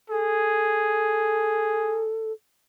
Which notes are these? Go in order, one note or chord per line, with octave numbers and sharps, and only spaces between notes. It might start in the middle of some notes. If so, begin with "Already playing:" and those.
G#4 A4